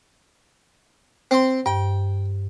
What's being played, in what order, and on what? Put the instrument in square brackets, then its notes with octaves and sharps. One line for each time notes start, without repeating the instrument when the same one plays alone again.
[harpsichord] C4 C6 [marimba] C5
[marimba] G2 [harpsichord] G5